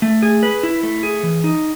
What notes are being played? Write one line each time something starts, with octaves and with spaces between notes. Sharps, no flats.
A3
G#4
B4
E4
A3
G#4
E3
D#4